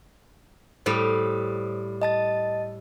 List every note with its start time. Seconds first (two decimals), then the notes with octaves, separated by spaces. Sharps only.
0.86 A2 G3 C5 D#6
2.02 D#5 A5 A6